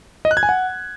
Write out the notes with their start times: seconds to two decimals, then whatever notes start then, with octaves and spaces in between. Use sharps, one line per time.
0.25 D#5
0.31 F#6
0.37 G#6
0.43 G#5
0.49 F#5